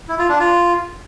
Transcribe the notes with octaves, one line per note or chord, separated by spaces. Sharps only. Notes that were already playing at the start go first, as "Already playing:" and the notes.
E4
F4
D4
F4